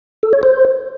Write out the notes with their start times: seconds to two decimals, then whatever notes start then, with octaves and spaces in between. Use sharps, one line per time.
0.23 A4
0.33 C#5
0.43 C5